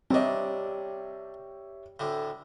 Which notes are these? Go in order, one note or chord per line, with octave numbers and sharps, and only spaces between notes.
C3 G3 C4 D4 G4 C#5 D#5 E5
D2 A2 D3